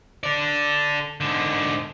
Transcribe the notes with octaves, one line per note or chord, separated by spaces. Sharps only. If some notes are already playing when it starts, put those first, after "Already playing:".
A4 D5
G#2 D3